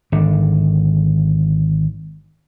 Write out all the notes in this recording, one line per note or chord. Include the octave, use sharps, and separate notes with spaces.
G#1 D3